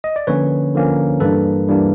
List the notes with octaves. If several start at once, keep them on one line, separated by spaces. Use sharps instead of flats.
D#5
D5
D3 F3 A#3 C#4 B4 C#5
D3 F3 A#3 C#4
G2 E3 G3 A#3 D4 A4 B4
G2 E3 G3 A#3 D4